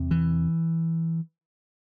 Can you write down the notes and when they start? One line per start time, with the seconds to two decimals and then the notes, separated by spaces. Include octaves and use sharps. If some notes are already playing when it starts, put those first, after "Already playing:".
Already playing: E2 C3
0.11 E3